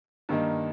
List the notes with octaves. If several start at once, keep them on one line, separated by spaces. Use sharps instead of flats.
G2 D#3 A#3 D#4